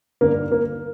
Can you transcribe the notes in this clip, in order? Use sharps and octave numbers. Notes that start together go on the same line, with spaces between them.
G2 D3 A#3
A#3